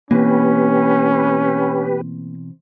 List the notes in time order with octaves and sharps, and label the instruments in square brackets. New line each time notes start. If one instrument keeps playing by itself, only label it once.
[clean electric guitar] B2 E3 C4 [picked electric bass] A#3 [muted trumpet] C#4 [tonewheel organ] G4 B4